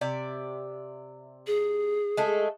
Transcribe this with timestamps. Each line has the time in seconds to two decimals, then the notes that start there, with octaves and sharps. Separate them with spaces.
0.01 C3 D5 E5
1.47 G#4
2.17 G#3 A3 A4